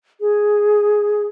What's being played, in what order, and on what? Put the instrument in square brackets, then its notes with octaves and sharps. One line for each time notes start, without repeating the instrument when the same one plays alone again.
[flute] G#4